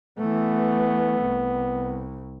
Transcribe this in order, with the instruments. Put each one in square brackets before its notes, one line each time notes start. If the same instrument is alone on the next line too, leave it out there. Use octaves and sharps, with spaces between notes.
[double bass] E3 A3 [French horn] B3
[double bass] C2